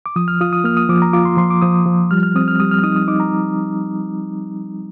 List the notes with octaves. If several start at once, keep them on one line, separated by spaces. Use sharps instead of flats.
D6
F3 D#6
F6
F4 D#6
D#6
A#3 F6
D#6
F3 D6
A#5
F4 D6
C6
F3 C6
D6
F3 D#6
F3
G3 F6
F6
C4 D#6
F6
G3 D#6
F6
D#4 D#6
D#6
D#4 D6
A#5